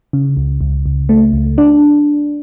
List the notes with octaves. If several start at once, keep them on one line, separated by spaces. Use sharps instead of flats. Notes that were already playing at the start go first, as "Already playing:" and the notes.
C#3
C#2
C#2
C#2
A3
C#2
D4